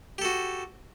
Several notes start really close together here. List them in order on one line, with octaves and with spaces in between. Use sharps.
G4 A4 F#4